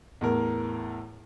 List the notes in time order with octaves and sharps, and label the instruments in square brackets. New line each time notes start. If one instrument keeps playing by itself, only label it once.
[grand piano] E2 A2 A#4